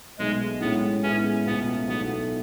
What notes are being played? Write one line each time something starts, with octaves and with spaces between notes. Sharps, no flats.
B1 B2 G#3 A3 D#4 G#4
A2 G#3 B3 C#4
A2 G#3 B3 C#4 E4 G#4
C#2 B2 A3 B3
B1 B2 A3 B3 E4 A4